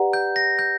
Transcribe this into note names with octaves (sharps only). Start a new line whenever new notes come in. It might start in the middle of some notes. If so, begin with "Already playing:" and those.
Already playing: G4 B4 D5 F#5 A#5
G6
A#6
G6